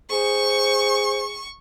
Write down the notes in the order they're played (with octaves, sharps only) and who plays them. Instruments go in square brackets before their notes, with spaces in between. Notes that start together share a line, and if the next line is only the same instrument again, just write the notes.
[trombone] G#4 [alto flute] C5 [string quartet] C#6